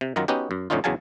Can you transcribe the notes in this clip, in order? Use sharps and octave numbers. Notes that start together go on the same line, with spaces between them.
C3
F#2 D#3 F#3 F4 A#5
B3 C#4 D#4 F#4 G4
F#2
F2 A2 D3 C#4 D#4 F4
E2 C#3 F#3 F5 G#5 A5